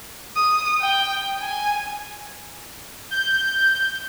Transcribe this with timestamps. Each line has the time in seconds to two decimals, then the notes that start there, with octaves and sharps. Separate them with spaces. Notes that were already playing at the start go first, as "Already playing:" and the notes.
0.36 D#6
0.81 G5
1.41 G#5
3.11 G6